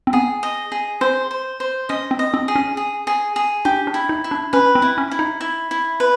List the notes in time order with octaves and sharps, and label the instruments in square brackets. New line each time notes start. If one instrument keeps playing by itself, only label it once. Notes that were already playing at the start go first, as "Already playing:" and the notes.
[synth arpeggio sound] C4
[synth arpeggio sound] B3 [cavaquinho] G#4
[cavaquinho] D#5
G#4
[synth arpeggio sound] C4 [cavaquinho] C5
[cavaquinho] C5
C5
[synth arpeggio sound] C#4 [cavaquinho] D#5
[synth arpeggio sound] C4
[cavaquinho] D#5
[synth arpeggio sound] C4
[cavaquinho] G#4
[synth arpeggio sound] C#4
[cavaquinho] G#4
G#4
G#4
[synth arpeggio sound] D4 [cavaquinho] G4
[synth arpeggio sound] D4
[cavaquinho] E4
[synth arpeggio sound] D#4
[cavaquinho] E4
[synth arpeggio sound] D4
[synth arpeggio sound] C#4 [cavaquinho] B4
[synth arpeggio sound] C4
[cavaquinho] E4
[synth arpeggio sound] C#4
[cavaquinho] E4
[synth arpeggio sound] D#4
[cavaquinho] E4
E4
B4